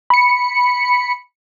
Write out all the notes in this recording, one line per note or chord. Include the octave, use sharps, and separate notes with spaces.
B5 C#7